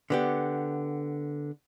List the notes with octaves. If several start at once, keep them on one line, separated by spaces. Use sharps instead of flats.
D3 B3 G4